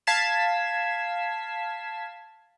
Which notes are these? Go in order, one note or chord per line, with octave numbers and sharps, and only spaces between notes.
F5 A5 G#6 B6 C7 E7